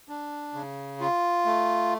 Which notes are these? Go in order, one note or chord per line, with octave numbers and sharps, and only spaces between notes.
D4
C#3
F4
A3